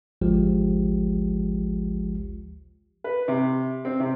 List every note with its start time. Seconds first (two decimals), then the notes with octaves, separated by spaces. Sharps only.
0.21 G#1 D2 F3 G#3 G4
3.04 B4
3.28 C3
3.85 C4
4.00 C3